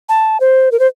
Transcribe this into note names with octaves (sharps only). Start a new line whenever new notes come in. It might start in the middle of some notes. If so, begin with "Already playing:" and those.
A5
C5
A#4
C5